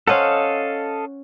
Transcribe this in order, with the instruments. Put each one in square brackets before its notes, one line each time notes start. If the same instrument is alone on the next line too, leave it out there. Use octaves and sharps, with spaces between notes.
[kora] C#4 C5 F#5 [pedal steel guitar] A4 D#5 F5